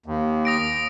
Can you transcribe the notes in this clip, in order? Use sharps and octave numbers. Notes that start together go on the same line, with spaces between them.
D#2
D#6 A#6 D7